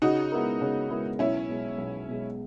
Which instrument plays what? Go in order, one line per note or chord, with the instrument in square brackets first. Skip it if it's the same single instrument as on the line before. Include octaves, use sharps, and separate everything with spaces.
[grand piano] C#3 [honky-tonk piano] D#4 F#4
[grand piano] G#3 B3 E4 A#4
C#3
G#3 B3 E4 A#4
[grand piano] B1 [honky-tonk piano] C#4 E4
[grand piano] B2 G#3
B1
B2 G#3